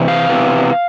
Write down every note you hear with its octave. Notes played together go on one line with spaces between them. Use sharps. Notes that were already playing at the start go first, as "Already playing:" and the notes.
Already playing: C3 E3
F5
C3 E3 B3